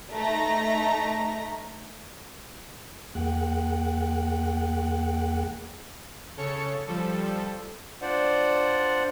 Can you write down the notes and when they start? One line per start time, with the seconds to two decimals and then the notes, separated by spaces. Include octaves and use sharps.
0.13 A3 D#4 A#5 A#6
3.15 E2 A#3 G#4 F#5 G5 F#6
6.37 C#3 A4 C#5 C#7
6.86 F3 G3 A4
8.02 D4 F4 C5 D5 F#5